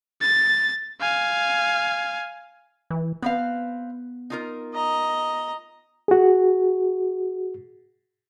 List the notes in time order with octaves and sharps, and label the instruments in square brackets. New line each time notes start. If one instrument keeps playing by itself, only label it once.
[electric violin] A6
F5 G#5
[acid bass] E3
[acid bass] B3 [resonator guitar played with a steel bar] C4 B4 F5
[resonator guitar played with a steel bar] D#4 F4 A#4
[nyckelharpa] D#5 A#5
[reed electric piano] F#4 G#4